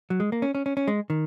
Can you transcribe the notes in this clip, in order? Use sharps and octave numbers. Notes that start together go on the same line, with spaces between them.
F#3
G#3
A#3
C#4
C#4
C#4
C#4
G#3
D#3